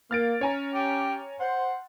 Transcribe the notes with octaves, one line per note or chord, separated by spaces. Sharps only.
A#3 F6 A6 D7
C#4 C#5 G#5 A#5
G4
C5 F#5